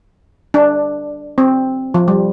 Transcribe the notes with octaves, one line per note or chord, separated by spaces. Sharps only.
D4
C4
F3
G3